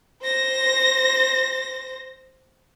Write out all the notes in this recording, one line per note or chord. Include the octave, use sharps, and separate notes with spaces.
C5 A#6